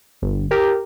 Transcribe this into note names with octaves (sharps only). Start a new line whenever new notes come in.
G1
G4 A#4